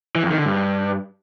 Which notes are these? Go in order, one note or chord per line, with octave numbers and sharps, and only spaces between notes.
E3
F2
D#3
D3
G2